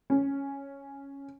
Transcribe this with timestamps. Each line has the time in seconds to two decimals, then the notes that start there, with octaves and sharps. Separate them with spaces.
0.10 C#4